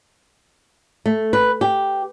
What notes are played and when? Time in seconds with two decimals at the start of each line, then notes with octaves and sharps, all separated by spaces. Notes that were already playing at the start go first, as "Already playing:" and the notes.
1.06 A3
1.33 B4
1.61 G4